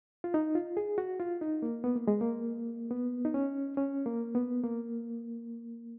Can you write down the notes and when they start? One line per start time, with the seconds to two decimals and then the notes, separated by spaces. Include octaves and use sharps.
0.24 F4
0.34 D#4
0.55 F4
0.77 G#4
0.98 F#4
1.20 F4
1.41 D#4
1.62 A#3
1.84 B3
1.95 A#3
2.07 G#3
2.21 A#3
2.91 B3
3.25 D#4
3.34 C#4
3.77 C#4
4.06 A#3
4.35 B3
4.63 A#3